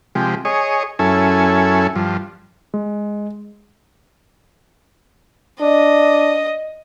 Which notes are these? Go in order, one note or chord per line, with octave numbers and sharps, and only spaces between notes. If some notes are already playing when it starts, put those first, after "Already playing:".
C3 F3 G#3 G4
G#4 C#5 D#5
F#2 C#4 E4 A4 G#5
G2 F3
G#3
D4 D#5